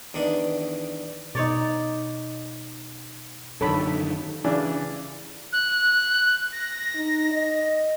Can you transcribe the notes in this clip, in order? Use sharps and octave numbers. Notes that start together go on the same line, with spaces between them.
E2 D#3 D4
B2 D#4 C#5 D5
F#2 D3 D#3 A4 C#5 B5
C#3 E3 D4
F#6
A#6
D#4
D#5